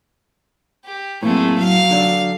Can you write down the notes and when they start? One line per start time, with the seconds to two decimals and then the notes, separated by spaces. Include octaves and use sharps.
0.85 G4
1.23 F#2 A2 A3 A#3 C4 G#4
1.58 F#3 F5
1.91 D3 D4 A4